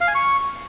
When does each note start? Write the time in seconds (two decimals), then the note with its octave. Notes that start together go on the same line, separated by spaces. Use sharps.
0.01 F5
0.08 G#5
0.15 C#6